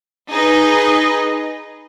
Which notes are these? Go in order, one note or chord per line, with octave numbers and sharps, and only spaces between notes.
D#4 G#4 B4 D#5